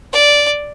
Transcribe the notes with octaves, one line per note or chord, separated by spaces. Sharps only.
D5